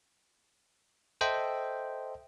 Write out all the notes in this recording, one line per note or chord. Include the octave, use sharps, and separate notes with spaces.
A4 C5 D#5 E5 G5